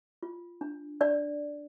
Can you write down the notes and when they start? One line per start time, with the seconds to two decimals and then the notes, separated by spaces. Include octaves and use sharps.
0.23 F4
0.61 D4
1.01 D4 D5